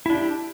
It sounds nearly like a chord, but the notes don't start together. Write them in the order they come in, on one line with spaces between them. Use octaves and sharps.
E4 D4 G4